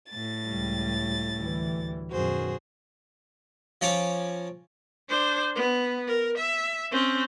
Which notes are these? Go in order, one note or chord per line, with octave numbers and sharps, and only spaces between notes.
A2 A6
C#2 G3
D2 E3 G3
F#2 B2 D#3 F#4 G#4 C5
F3 C#4 C#5 A#5 D6
D4 C5
B3
A#4
E5
C4 C#4